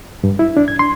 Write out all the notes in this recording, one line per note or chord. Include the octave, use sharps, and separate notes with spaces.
G2
E4
D4
G#6
C6